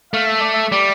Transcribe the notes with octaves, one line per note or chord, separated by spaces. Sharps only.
A3 F5
E5
D5
E5
G3 D5